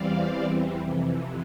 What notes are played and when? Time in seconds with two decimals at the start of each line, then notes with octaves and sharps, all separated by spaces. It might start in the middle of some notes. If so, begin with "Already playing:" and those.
Already playing: E2 E3 G3 C4 D5 F5
0.81 F2 C3 E3